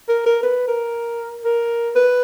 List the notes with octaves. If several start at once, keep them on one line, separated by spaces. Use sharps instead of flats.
A#4
A#4
B4
A#4
A#4
B4